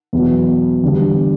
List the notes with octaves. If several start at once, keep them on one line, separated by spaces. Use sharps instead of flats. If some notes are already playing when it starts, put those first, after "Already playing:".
E2 B2 F#3
E2 D3 G3 D4